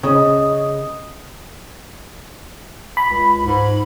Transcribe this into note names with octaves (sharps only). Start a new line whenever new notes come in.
C#3 D#5
B5
C#2
G#2